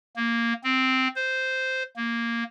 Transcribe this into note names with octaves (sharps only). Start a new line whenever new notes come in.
A#3
C4
C5
A#3